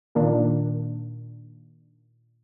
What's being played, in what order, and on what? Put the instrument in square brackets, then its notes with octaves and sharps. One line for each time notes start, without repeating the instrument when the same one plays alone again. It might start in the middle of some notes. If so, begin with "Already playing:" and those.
[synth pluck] A#2 D#3 A#3 D4